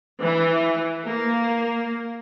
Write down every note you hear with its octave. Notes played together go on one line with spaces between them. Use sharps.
E3
A#3